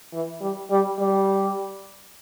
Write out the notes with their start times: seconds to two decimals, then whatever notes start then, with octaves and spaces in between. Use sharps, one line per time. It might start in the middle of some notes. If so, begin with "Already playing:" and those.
0.13 E3
0.41 G3
0.71 G3
0.99 G3